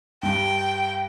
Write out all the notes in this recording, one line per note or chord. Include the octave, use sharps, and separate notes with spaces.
G2 G5